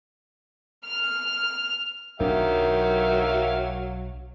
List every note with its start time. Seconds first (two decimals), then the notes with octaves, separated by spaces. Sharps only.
0.84 F6
2.20 B1 D#3 F#3 D4 G4 E5 F5